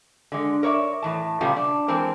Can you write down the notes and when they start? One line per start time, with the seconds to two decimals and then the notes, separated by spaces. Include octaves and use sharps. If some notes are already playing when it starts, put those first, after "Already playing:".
0.32 D3 G#3
0.63 A#4 C#5 D5 E5
1.02 A2 E3 A5
1.41 A#2 C#3 G3 A3 B3 F4
1.56 D4
1.88 E3 G#3 C4 A#4